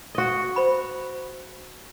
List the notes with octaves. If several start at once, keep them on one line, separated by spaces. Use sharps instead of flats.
F#4 D#5
C5 B5